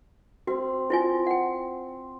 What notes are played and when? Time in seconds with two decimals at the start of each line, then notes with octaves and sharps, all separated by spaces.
0.47 C4 F#4
0.90 E4 F4 G#5
1.27 F#5 G5